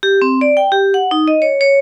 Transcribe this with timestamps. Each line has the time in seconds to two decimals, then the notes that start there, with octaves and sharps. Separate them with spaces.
0.03 G4
0.22 C4
0.41 D5
0.57 G5
0.72 G4
0.94 F#5
1.11 D#4
1.28 D#5
1.42 C#5
1.61 C#5